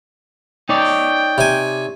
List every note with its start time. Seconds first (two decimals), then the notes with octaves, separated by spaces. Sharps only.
0.69 D#4 C#5 D5 G5
1.38 C3 G#5